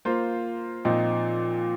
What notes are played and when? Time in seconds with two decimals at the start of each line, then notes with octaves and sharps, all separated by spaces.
0.05 A#3 F4 C5
0.85 A#2 F3 C4 D#4